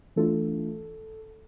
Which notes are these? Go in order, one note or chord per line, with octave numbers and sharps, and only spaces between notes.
E3 A3 D4 F4 A4